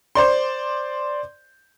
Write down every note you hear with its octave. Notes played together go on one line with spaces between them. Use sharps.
C5 D5 C6